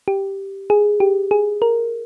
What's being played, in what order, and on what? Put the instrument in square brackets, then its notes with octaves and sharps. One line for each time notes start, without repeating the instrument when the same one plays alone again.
[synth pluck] G4
G#4
G4
G#4
A#4